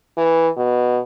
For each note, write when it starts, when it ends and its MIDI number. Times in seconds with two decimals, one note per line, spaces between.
0.17 0.48 52
0.57 0.99 47